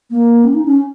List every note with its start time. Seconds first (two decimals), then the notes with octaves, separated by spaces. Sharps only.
0.10 A#3
0.44 C#4
0.54 D#4
0.65 C#4